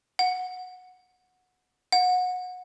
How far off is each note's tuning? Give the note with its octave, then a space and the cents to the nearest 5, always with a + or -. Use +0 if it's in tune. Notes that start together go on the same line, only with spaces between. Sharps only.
F#5 -15
F#5 -25